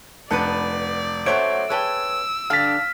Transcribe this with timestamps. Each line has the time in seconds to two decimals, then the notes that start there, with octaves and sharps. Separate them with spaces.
0.31 F1 B3 D4 B4 D5 A5 C#7
1.26 F#2 F#3 A3 C5 C#5 E5 D7
1.70 G#4 B4 C#5 G5 A5 E6
2.50 G2 D3 D4 F5 F6 A6 B6